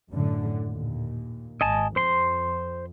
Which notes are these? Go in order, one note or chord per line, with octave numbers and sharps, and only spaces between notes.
F#2 A2 D3
D#2 A#2
G#1 D#5 G#5 A5
F2 C5 C6